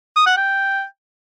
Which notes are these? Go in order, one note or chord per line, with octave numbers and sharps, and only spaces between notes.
D#6
F#5
G5